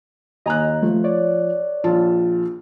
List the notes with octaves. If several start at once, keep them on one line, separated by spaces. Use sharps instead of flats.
D#2 D#5 G#5 A#5 F#6
F3 A3
C#5 D5
A#1 F4 A5